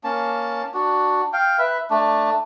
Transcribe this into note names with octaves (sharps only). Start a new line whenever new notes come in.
A#3 C#4 A5
D4 F#4
F5 G5
B4 E5
A3 D4